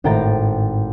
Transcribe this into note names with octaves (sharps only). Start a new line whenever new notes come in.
G#1 A2 G5 A#5 A6